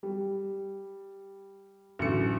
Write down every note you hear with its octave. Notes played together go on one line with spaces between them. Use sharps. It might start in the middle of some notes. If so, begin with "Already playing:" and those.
G3
A1 D3 F#3 C#7